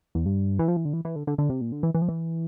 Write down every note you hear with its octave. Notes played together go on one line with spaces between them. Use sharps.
E2
G2
E3
F3
E3
D3
E3
E3
D3
D3
D3
C3
A#2
D3
E3
E3
F3
E3